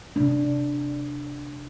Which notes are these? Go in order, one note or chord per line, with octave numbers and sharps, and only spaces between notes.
C3 D4